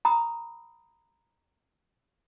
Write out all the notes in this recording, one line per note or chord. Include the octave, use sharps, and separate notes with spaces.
A#5 B5 D#6